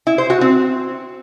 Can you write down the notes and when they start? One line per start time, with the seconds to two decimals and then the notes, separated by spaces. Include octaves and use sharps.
0.07 E4
0.18 C5
0.30 F#4
0.41 C4